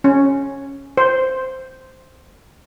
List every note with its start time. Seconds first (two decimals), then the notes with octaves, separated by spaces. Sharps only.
0.04 C#4
0.97 C5